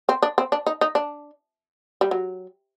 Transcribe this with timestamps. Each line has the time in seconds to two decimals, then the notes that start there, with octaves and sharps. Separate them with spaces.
0.09 C4
0.23 D4
0.38 C4
0.52 D4
0.67 D#4
0.81 D#4
0.95 D4
2.01 G3
2.11 F#3